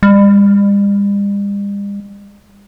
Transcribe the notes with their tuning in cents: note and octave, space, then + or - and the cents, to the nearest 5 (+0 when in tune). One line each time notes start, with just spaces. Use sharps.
G3 +45